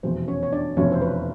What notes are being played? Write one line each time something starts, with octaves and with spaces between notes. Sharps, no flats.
F1 E2 B2 C5
C#4 C#5
C#5
D4 D5
F1 E2 B2 C#4 C#5
C5
B4